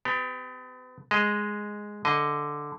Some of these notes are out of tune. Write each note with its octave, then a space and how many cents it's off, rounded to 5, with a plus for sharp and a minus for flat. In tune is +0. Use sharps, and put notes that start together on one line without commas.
B3 +40 G4 +10
G#3 +0 D#5 +0
D3 +0 D#5 +5